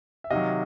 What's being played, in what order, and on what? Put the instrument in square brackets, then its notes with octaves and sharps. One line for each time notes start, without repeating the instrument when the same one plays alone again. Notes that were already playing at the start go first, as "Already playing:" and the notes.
[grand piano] E5
C3 D#3 F#3 D#5 F5